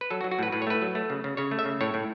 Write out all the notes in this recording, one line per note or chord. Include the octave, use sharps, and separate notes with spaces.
B4
F#3 A4
F#4
F#3
F#4
A2 B4
A2 B4
C#5
A3 B4
F#3
A3
C#3
C#3
C#3 C#5
A3
E5
C#3
A2 C#5
A2